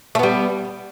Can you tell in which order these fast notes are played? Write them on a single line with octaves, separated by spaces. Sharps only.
A3 B3 G3